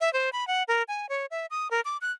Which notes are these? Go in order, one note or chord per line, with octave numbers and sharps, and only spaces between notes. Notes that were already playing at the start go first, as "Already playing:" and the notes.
E5
C5
B5
F#5
A#4
G#5
C#5
E5
D#6
A#4
D6
F#6